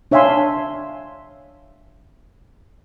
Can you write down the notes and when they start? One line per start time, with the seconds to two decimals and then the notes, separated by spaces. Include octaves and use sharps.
0.11 D4 C#5 E5 F5 G#5 C6